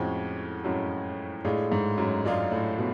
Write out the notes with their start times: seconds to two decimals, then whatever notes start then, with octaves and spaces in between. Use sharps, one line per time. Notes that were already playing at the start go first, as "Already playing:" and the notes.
Already playing: F2 A2 G#3 C#4 F#4
0.64 F#2 A2 G#3 C#4 F#4
1.45 A2 G#3 D4 F4 G#4
1.72 G#2
1.98 F#2
2.25 F#2 G#3 D4 F4 G#4
2.51 A2
2.78 B2